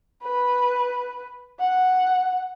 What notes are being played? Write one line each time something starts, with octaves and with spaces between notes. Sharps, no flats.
B4
F#5